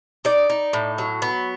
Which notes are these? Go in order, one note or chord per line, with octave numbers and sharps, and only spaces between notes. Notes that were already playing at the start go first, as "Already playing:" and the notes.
D#4 D5
D#4
A2
F#3
B3